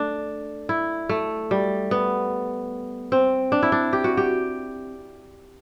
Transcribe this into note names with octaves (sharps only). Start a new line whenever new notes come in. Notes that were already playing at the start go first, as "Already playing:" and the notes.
Already playing: A3 D4
E4
A3
G3
B3
C4
D4
E4
D4
G4
F#4
G4